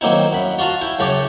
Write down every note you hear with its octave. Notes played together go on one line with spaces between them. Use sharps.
D#3 F#3 A#3 C4 D#4 E4
F#2 B5
F4 F#4 F5 A5 A#5
E4 G5
F#2 C#3 C#4 G5 A5 D6